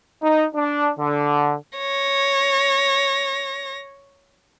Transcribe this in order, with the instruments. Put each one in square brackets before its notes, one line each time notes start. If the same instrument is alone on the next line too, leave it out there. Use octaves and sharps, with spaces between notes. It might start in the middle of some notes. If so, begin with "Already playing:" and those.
[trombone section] D#4
D4
D3
[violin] C#5 A#6